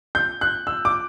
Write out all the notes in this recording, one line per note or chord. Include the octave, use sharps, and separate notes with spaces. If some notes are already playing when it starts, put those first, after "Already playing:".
G6
F#6
E6
D6